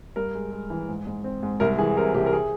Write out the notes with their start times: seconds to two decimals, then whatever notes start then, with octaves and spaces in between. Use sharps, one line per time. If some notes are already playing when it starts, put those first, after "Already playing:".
0.16 G2 A#4
0.34 G#3
0.52 G#3
0.70 E3
0.88 G#2
1.06 G#2
1.24 C4
1.43 G#2
1.60 C2 A#4
1.78 E3 G#4
1.97 C3 A#4
2.14 C2 G4
2.26 A#4
2.33 G#4